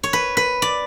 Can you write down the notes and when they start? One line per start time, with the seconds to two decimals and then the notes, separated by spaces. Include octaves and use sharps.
0.03 C#5
0.13 B4
0.37 B4
0.62 D5